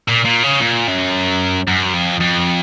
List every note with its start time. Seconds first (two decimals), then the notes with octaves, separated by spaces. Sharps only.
0.08 A#2
0.25 A#2
0.43 C#3
0.60 A#2
0.87 F#2
1.68 F#2
1.94 F2
2.20 F2